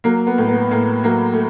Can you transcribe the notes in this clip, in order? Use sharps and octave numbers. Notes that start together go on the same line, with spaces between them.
F#3 A#3
B3
A2
B3
A2 A#3
F#3 A#3
A3